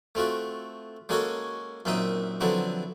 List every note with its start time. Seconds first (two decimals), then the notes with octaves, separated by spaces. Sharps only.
0.15 A3 C4 F4 F#4
1.09 G#3 A#3 C#4 F#4 A4 C#5
1.85 F#2 A#2 C4 D#4 E5 D#6
2.41 D3 F3 F#3 B3 C4 E4